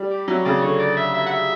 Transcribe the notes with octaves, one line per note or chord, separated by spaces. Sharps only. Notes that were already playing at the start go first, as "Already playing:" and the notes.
Already playing: G3
G4
F#3 E5
C#5
C#3 D5
D3 C#5
D5
E5
E5
F#5
E5